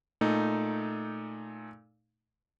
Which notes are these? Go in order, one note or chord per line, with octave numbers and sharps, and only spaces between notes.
A#2 A3 D#4